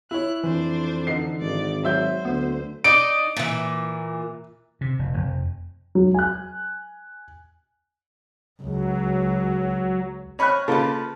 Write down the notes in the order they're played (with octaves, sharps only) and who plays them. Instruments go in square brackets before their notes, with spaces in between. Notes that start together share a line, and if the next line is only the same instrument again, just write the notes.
[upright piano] E4 C#5 [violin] F#6
[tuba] F2 [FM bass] E3 [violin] D4 C5
[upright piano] D3 D#4 C7
[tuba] G#1 [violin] D5
[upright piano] F#3 E5 G6 [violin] C5
[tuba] D2 [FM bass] B3
[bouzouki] D#4 D5 D#5 [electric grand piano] D7
[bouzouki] A#2 E3
[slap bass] C3
F1
F1
[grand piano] F#3
G#5 F#6
[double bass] C#2 [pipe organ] F#3
[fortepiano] C#5 F6 F#6 [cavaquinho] D#5 B5 C#6
[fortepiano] C#3 A#3 F4 [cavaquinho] A4 B4